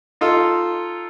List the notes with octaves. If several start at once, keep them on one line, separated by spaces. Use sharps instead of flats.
D#4 F4 A4